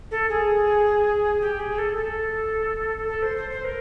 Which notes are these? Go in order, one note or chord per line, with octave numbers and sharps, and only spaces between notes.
A4
G#4
G4
G#4
A4
A4
A4
C5
C5
C5
A#4